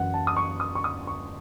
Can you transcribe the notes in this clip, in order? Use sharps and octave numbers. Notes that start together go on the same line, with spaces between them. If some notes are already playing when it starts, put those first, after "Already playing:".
Already playing: F#2 E3 F#5
A5
D#6
C#6
D#6
C#6
D#6
C#6